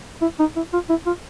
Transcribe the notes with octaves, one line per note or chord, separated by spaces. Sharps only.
E4
D#4
E4
F4
E4
F4